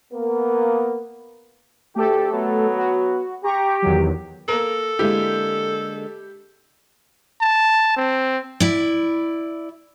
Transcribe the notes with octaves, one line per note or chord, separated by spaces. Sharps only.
A#3 B3 A#4
D2 A3 G4 A4
F#3 B3
F#4
G4 A#5 C#6
E2 D#3 F#3
A#3 A4 A#4
D3 G#3 A#3 E4 G4
A5
C4
E4 D5